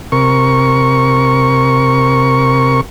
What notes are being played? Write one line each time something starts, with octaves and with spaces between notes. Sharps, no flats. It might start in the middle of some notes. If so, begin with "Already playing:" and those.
C3 A#4 C#6